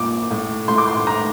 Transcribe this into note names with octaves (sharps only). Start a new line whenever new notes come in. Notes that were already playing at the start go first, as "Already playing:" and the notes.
Already playing: A#2 D6
A2
A2 C6
D6
C6
A2 A#5